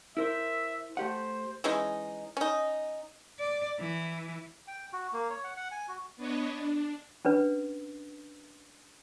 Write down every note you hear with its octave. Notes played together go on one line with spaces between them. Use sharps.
E4 A#4 C5 E5
A3 G4 C5 F#5
E3 G#3 C#4 D#4
C#4 D#4
D5
E3
G5
F#4
A#3
C#5
F#5
F#5
G#5
F#4
B3 D4 B4 C#5 D#5
D4
C#4 D4 B4